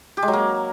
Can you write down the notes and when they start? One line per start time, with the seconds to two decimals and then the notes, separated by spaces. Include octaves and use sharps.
0.17 G4
0.23 G#3
0.28 F#3
0.33 A#3